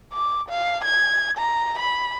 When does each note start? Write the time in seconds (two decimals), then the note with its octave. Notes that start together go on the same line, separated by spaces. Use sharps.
0.13 D6
0.49 F5
0.85 G#6
1.38 A#5
1.79 B5